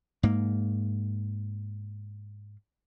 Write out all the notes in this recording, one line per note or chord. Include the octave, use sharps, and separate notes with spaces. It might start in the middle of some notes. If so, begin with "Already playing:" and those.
G#2 A#3